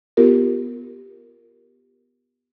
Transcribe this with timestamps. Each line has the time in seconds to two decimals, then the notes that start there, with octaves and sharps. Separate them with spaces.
0.17 B3 F4 G4 A#4